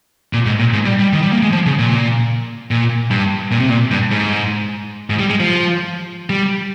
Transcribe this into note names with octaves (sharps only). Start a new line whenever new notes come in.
A#2
G#2
A#2
G#2
G3
G3
D#3
G3
A#3
G#3
F3
C#3
A#2
A#2
G2
A#2
C3
A#2
G2
G#2
G#2
G3
G#3
F3
G3